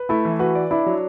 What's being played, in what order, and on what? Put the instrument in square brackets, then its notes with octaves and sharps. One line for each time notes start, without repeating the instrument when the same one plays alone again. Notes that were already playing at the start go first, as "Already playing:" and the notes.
Already playing: [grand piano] B4
[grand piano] A3 [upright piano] E4
[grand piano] E3
[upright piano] F#4 [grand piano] B4
[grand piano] D5
[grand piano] D4 [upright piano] E4
[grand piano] F#3